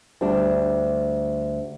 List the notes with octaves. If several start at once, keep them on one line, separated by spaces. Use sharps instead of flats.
D2 G3 D4